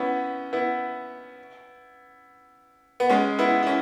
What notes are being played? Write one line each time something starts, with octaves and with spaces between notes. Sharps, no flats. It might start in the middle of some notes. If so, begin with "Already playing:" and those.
Already playing: B3 C#4 E4
B3 E4
B3
G#3 C#4
B3 E4
E4
C#4